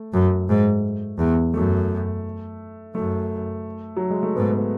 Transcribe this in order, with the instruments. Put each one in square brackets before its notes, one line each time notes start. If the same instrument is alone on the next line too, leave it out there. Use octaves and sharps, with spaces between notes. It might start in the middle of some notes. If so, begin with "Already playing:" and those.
Already playing: [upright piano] A3
[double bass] F#2
G#2
E2
[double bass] F#2 [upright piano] A3
[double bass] F#2 [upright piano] A3
[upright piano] F#3
G#3
A3
[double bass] G#2 [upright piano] B3
[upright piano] B3